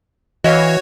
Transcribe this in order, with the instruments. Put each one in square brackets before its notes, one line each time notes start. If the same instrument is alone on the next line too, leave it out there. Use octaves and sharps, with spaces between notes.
[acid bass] E3 [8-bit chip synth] F#4 C#5 [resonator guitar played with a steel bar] D#5 F5